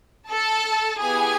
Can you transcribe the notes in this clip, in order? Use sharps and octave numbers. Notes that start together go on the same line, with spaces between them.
A4 A5
B3 E4 G4 G#4 G#5